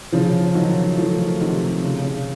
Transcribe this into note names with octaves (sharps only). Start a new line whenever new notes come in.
C#3 F3
D#3 F#3
F3 A3
C3 D#3
C#3
C#3